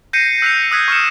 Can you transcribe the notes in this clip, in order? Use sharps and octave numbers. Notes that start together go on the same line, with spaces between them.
G6 A#6 C7 C#7 D#7
E6 F#6 B6 C#7 F7
D#6 E6 F#6 G#6 B6
C#6 F6 C#7 E7